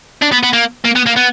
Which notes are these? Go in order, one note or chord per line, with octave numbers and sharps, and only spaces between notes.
D4
B3
B3
A#3
A#3
B3
A#3
B3